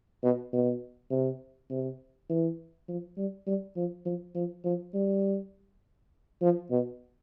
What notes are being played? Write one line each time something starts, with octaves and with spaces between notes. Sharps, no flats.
B2
B2
C3
C3
E3
F3
G3
G3
F3
F3
F3
F3
G3
F3
B2